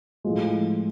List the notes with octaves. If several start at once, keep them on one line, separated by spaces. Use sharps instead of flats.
A2 F3 G#3